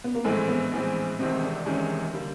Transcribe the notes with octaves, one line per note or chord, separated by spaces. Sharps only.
B3
A#3
A#1 A2 E3 G#3 A3 C4
B3
A#1 A2 E3 G#3 C4
F1 E2 C3 D#3 G#3 C4
D4
F1 E2 C3 D#3 G#3 C#4
D3 G3 A#3